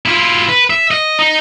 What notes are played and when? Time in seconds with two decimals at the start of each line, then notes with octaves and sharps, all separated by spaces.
0.06 E4 F4
0.49 B4
0.70 E5
0.91 D#5
1.19 D#4